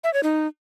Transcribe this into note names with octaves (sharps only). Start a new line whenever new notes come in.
E5
C#5
D#4